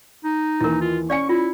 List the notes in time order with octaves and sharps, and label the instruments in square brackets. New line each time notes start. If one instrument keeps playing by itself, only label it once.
[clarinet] D#4
[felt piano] D#2 E3 [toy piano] E4 A#4
[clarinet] F4
[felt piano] C#4 C#7 [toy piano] D5 F5 G#5 [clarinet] C#6
[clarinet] E4 [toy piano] F4